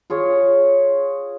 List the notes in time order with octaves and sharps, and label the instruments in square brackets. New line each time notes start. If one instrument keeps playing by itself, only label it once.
[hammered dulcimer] F4 G#4 C#5